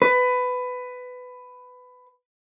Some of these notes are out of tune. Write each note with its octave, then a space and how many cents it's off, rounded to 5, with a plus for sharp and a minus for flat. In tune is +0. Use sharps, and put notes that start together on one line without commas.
B4 +15